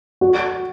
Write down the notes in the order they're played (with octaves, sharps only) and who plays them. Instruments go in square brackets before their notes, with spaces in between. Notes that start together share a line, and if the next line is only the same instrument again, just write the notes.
[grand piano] F#4